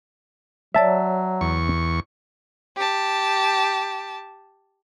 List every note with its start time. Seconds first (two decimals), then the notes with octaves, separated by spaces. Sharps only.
0.75 F#3 C#5 D5 E5 A5
1.41 E2 C#6
2.76 G4 A5